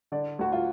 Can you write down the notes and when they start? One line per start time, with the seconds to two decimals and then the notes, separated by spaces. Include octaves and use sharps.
0.12 D3 D5
0.39 D2 F#4
0.53 F4